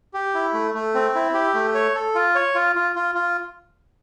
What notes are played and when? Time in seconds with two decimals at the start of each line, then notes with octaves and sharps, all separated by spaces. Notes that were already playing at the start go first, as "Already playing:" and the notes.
0.14 G4
0.34 E4
0.54 A3
0.74 A3
0.95 C4
1.15 E4
1.34 G4
1.54 A3
1.74 C#5
1.95 A4
2.15 F4
2.35 C#5
2.55 F4
2.76 F4
2.96 F4
3.15 F4